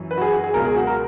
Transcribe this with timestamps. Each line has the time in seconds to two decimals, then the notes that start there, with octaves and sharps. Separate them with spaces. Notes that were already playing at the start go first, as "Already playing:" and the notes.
Already playing: F#2 E3
0.11 B4
0.17 F#4
0.21 G#4
0.33 F#4
0.44 G#4
0.54 C#2 B2 F#3 A#4
0.65 G#4
0.76 F#4
0.87 A#4